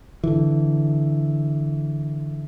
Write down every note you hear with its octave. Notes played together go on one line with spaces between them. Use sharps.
D3 E3